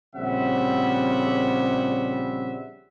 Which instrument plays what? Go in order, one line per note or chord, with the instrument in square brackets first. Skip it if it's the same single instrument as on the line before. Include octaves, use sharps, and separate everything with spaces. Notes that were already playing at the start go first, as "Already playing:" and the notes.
[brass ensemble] A#1 C#3 G3 C4 E5 F#5